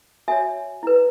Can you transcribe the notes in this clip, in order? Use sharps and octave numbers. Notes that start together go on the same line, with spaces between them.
F#4 C#5 E5 G#5
E4 B4